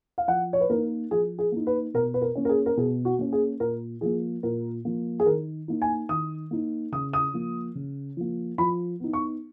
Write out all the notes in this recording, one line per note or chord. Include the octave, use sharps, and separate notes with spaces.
F5
F3 F#5
C#5
B4
A#3 D#4 A#4
F3 G#4
G#4
A#3 D#4
B4
B2 A#4
B4
A#4
A#3 C#4
A#4
G#4
A#4
B2 G#4
F#4
A#3 C#4
G#4
A#2 A#4
F3 A#3 G#4
A#2 A#4
F3 A#3
G#4
D#3 A#4
A#3 D#4
G#5
D#3 D#6
A#3 D#4
C#3 D#6
D#6
F3 A#3
C#3
F3 A#3
F3 B5
B3 D#4
C#6